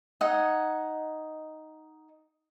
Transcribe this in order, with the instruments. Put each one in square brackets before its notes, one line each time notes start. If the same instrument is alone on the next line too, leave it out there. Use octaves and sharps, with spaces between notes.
[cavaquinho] D#4 D#5 F#5 G#5